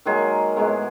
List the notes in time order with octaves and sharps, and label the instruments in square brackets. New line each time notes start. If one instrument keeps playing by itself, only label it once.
[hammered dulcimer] D#3 F#3 G#3 A#3 G#4
A2 E3 G#3 B3